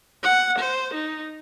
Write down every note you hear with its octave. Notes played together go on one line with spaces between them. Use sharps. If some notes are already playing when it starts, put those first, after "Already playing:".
F#5
C5
D#4